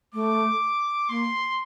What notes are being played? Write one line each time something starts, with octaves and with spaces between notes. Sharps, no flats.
A3 D6
A#3 C6